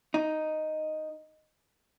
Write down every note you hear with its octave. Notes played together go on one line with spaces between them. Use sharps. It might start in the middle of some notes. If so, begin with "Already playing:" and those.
D#4